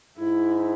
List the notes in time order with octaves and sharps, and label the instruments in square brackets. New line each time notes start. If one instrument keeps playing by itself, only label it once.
[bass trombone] G#2 [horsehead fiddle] E4